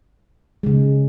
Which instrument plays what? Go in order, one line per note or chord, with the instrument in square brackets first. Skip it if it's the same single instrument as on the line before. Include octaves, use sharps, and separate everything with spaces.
[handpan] C#3 G#3